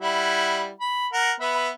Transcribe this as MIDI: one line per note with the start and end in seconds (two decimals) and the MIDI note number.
0.01 0.70 55
0.01 0.70 64
0.01 0.70 78
0.80 1.07 83
1.13 1.32 70
1.13 1.32 78
1.40 1.70 59
1.40 1.70 71
1.40 1.70 76